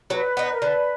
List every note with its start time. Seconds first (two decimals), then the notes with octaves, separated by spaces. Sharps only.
0.10 F#3 B4
0.37 B3 D#4
0.51 A#4
0.62 D3 B4